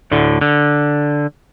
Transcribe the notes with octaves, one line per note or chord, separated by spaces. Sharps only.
D2 A2 D3
D3